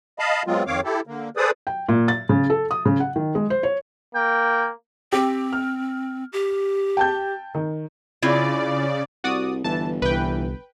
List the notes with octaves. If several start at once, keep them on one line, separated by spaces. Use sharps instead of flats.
D#5 F5 A5 B5
F#3 G#3 B3 C4 F4
F2 D#3 C4 C#5 F5 D6
E4 G4 A4
D3 A#3
G#4 A4 B4 C5 D5 D#6
G5
A#2
A6
C#3
A4
D#6
C#3
F#5
D#3
G#3
C5
C#5
A#3 G5
C4 G4
F6
G4
G5 A5 G6
D#3
C#3 C4 E4 F4 D5
C2 F#4 D5 D#6
G1 E3 A5
C2 E3 B4 G5